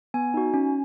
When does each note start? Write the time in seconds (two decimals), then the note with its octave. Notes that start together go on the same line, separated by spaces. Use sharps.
0.14 B3 G#5
0.34 D#4 F#4
0.54 C#4